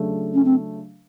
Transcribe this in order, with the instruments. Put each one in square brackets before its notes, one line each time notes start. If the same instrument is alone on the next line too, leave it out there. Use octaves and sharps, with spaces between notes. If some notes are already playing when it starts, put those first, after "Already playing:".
Already playing: [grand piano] C#3 F#3 A3 D4
[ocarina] C#4
C4